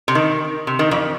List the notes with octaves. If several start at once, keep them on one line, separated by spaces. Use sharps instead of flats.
C3
D#3
C3
D#3
F2 F3